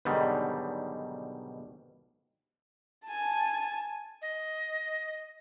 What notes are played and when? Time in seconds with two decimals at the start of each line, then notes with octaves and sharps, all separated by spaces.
0.05 B1 G#2 B2 D3 D#3 G3
3.05 G#5 A5
4.22 D#5